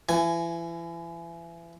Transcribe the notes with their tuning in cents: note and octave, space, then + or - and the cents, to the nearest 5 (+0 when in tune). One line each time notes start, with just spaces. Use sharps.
E3 +35 G#5 +0